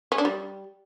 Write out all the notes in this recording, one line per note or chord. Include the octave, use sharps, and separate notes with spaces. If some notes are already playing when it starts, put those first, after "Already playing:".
C#4
D4
G3